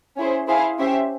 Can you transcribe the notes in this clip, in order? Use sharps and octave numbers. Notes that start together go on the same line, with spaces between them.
C#4 E4 G#4 C5
E4 G#4 C5 F5 G#5
C#4 G4 C5 E5